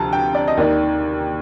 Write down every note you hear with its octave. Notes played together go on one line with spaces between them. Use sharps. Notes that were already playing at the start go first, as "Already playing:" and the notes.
Already playing: D2 C3 F3 A5 A#5
G5
D5
D#5
D#2 D#3 D5